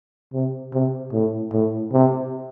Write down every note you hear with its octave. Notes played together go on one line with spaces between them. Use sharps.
C3
C3
A2
A2
C3